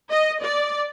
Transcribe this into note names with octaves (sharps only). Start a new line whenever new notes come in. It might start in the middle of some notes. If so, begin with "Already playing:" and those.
D#5
D5